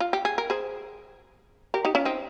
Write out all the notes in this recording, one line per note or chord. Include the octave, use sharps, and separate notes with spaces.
F4
G4
G#4
A#4
G#4 C5
G4 A#4
D#4 G4
C#4 F4
C4 D#4